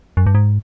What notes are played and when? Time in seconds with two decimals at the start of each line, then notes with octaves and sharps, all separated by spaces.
0.17 F#2
0.27 G2
0.35 G#2